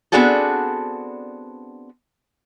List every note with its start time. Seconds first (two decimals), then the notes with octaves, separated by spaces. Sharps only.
0.12 B3 C4 D4 F#4 G#4 A4